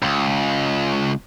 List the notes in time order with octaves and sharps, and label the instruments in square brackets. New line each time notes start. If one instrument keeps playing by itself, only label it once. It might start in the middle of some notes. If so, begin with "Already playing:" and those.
[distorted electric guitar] C#2